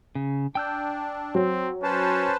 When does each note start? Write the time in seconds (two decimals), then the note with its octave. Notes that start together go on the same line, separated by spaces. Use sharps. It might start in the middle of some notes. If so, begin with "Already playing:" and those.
0.15 C#3
0.55 D4 G5 E6 G6
1.35 F#3 C4
1.83 C#4 B4 C5 A5